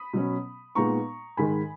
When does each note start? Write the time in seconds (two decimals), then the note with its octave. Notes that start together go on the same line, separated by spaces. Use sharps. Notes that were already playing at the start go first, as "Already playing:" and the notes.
Already playing: B5 D#6
0.13 B2 F#3 C#4
0.75 A#2 G#3 B3 D#4 A#5 C#6
1.37 G#2 D#3 G#3 G#5 B5